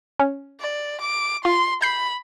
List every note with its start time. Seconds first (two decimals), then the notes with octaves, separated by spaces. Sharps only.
0.19 C#4
0.61 D5
1.02 D6
1.45 F4 C6
1.82 B5 G6 C7